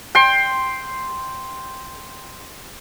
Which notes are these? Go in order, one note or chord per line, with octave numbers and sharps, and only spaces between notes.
G5 C6